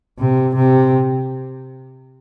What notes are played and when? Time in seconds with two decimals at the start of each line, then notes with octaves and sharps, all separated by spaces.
0.19 C3
0.56 C3